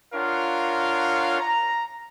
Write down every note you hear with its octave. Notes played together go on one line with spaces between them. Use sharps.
D4 F4 A#4 C#5 F5 F#5
A#5